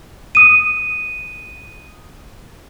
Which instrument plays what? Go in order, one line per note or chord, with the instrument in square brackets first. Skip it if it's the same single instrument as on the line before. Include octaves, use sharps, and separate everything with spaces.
[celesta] D#6 D#7